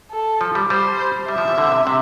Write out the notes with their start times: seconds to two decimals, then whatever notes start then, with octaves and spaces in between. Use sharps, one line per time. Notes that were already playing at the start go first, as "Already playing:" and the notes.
0.11 A4
0.41 F3
0.55 G3
0.70 G3 C5
1.28 G3 E5
1.38 F3
1.48 E3
1.58 D3
1.72 C3
1.87 C3